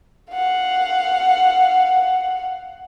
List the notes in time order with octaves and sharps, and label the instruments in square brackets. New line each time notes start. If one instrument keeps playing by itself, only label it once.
[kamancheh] F5 F#5